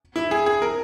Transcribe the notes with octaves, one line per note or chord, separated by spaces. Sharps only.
E4
G#4
G#4
A#4